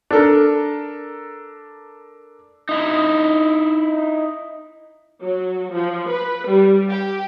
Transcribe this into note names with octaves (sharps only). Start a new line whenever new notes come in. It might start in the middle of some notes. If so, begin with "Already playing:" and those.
D4 A4 A#4
D#4 E4
F#3
F3
B4
G3
G4